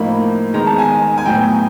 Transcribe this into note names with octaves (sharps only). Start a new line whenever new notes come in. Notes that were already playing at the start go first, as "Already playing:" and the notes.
Already playing: A2 F3 A#3 D#4 B5
D#3 G#3 B3 A#5
A5
G#5
G#5
A2 F#3 B3 G5